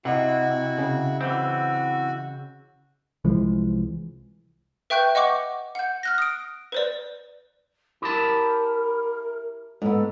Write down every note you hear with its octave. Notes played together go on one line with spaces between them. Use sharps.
C3 E4 F#4 D#5 F#5
C#3
E3 C4 F#4
C2 E3 F3 G#3
B4 E5 G5 C#6 F#6 G6
D#5 F#5 C#6 D6
F#5 G6
F6 F#6 A#6
D#6 D7
B4 C5 D5
E4 G4 A#4 A5
G#2 B3 A4